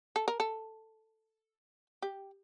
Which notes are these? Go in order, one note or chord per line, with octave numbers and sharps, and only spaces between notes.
A4
A#4
A4
G4